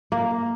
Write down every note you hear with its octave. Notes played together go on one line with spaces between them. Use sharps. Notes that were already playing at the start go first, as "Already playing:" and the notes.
A#3